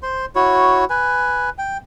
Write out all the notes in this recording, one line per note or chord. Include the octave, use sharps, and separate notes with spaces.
C5 C6
E4 F#4 C#5
B4 G#5
G5